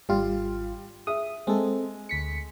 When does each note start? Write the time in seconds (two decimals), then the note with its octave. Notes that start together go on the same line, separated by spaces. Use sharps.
0.09 G#1 G3 F4 F5
1.07 G#4 E5 D#6
1.47 G#3 C4 A4
2.09 D2 B6 C#7